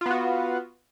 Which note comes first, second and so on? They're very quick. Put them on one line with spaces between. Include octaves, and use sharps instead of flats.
F4 B3 F#4